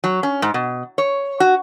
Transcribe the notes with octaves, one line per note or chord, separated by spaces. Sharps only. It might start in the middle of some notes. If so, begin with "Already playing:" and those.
F#3
C#4
G#2
B2
C#5
F#4